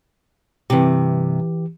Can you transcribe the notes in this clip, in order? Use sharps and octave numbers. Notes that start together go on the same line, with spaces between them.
G2 C3 E3 G4